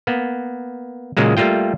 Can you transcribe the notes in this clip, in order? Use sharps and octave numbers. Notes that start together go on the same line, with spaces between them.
A#3 B3
A#2 C#3 F#3 G#3 A#3
G3 A3 A#3 F4 G5